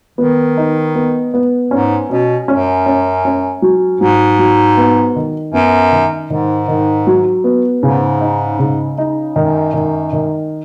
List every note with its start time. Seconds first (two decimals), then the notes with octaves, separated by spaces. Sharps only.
0.18 D#3 B3
0.57 D#4
0.95 B3
1.34 B3
1.71 G#2 C#4
2.10 B2 C#4
2.48 F#2 C#4
2.86 C#4
3.25 C#4
3.62 F#3
4.00 G#2 F#3
4.39 F#3
4.77 B3
5.16 D#3
5.53 F#2 B3
5.92 D#3
6.30 G#2 D#3
6.68 D#3
7.07 F#3
7.44 B3
7.83 G#2 C#3
8.21 D#4
8.59 C#3
8.98 D#4
9.36 F#2 D#3
9.74 D#3
10.13 D#3